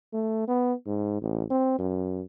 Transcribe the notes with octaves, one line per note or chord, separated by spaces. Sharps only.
A3
B3
G#2
A1
C4
F#2